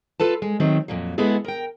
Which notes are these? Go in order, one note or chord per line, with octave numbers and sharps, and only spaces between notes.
F4 A4 B4 A5
G#3
D#3 F#3 A3 C4
F2 A#2 F#3
G#3 B3 E4 F#4 G#4 A4
A#4 G5